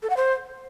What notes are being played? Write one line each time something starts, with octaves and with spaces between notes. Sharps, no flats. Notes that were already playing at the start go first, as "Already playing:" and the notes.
A4
F#5
C5